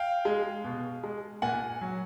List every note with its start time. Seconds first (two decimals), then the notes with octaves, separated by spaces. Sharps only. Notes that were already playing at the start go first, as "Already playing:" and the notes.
Already playing: F5 G5
0.25 G#3
0.64 B2
1.03 G#3
1.42 A#2 F#5 G#5
1.81 F#3